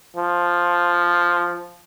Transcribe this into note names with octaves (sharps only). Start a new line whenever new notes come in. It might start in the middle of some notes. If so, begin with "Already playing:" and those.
F3